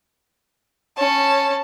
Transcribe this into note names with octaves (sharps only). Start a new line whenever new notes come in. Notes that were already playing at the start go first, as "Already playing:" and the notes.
C#4 A5